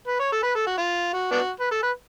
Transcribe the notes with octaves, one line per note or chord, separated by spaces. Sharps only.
B4
C#5
A4
B4
A4
F#4
F4
F#4
B3 D4 F#4
B4
A4
B4